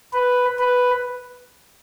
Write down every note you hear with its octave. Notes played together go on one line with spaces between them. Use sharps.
B4
B4